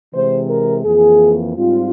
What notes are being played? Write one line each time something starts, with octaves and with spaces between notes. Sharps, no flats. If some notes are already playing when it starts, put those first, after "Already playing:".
C3 E3 G#3 C5
A#4
F2 E3 A#3 G#4
G#2 G3 C4 F4